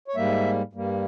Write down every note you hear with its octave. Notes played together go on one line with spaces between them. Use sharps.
C#5
G#2 G3 A#3 E5
G2 G3 A#3